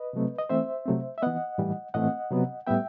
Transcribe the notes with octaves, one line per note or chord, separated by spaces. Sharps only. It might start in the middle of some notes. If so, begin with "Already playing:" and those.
Already playing: B4 D#5
C3 F#3 A3 C4
D#5
E3 A3 C4 C5 E5
C3 F#3 A3 C4
E5
E3 B3 D#5 F#5
A2 E3 G3
A2 E3 A3 C4 D#5 F#5
C3 F#3 B3
A2 G3 B3 E5 G5